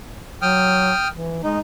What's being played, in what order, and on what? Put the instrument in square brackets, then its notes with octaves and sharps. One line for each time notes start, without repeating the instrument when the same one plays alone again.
[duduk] F#3 [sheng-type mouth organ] G5 D#6 F6
[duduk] E3
[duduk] G#3 [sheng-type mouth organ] D#4